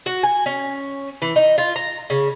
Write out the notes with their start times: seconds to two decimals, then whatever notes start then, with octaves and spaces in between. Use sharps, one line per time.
0.06 F#4
0.23 G#5
0.46 C#4
1.22 E3
1.36 D#4
1.58 F4
1.76 A#5
2.10 C#3